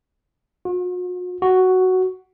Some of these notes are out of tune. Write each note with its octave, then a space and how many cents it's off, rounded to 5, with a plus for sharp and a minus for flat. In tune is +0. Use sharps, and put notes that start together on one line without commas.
F#4 -45
F#4 +5